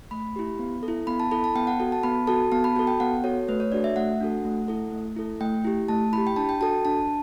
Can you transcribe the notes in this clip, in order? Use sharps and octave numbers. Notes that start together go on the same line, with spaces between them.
A3 B5
E4 G4
B3
A4
E4
B3 B5
A5
E4 A4 B5
A5
B3 G5
F#5
F#4 A4
A5
B3 B5
F#4 A4 A5
B3 A5
B5
F#4 A4 A5
G5
B3 F#5
F#4 A4 C#5
A3 B4
C#5
D4 F#4 A4 D5
E5
A3 F#5
D4 F#4 A4
A3
E4 A4
A3
E4 A4
A3 G5
E4 G4
A3 A5
E4 G4 B5
G5
D4 A5
G5
F#4 A4 A5
D4 A5